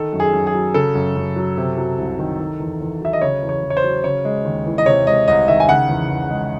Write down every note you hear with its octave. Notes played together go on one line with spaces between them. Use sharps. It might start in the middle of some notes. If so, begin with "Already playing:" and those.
Already playing: D#3 A4
F#2
G#4
F#2
G#4
F#3
C#3 A4
F#2
F#2
F#3
C3
F#3
C2
D#3
D#3
E2
E2
F#3 E5
D#5
C#3 C#5
E2
C#5
E2
C#5
C5
F#3
C#3 C#5
G#3
D#2
E3
D#5
C3 C#5
G#3 D#5
C2 D#5
D#3 E5
G#5
C#3 F#5
E2
E2
G#3